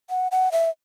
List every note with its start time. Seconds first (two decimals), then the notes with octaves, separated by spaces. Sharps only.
0.10 F#5
0.32 F#5
0.52 E5